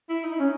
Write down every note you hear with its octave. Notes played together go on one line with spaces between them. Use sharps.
E4
D#4
E4
C#4 D#4